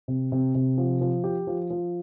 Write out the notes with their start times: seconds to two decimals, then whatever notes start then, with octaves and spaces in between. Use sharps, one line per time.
0.08 C3
0.32 C3
0.55 C3
0.78 F3
1.01 F3
1.24 G4
1.47 F3
1.70 F3